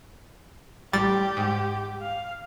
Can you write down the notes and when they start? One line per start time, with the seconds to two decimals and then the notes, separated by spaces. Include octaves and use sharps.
0.93 A1 G3 G4 A6
1.37 G#2
2.02 F5